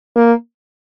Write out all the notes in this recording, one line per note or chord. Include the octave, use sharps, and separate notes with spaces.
A#3